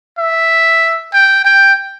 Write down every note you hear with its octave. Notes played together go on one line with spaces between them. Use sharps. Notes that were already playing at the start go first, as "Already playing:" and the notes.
E5
G5
G5